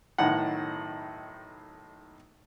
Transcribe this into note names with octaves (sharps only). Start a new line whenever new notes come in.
B1 A2 D#3 F#5